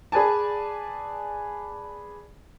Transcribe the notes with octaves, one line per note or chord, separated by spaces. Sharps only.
G#4 B4 D5 G#5 A5